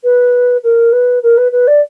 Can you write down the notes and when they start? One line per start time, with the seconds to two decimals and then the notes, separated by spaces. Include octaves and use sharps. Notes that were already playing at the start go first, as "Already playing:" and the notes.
0.03 B4
0.63 A#4
0.92 B4
1.23 A#4
1.37 B4
1.52 B4
1.67 D5